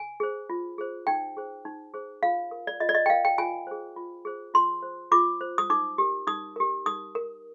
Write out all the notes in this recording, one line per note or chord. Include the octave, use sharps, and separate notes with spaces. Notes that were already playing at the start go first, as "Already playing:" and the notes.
Already playing: G#5
G#4 C5
F4
G#4 C5
D#4 G5
G#4 C5
D#4
G#4 C5
F4 F5
A#4
D5
F4 D#5
D5
D#5
G5
A#4 F5
G5
F4 G#5
G#4 C5
F4
G#4 C5
F4 C6
C5
F4 D6
C5
D#6
D#4 D6
G4 A#4
D#4 D#6
G4 A#4
D#4 D#6
A#4